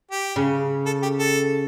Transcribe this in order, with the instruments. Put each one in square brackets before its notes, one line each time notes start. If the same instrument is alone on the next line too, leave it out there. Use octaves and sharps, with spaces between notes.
[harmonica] G4
[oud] C#3
[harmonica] A4
G4
A4